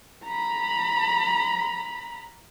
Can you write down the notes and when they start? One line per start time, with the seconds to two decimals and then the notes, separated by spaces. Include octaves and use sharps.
0.25 A#5 B5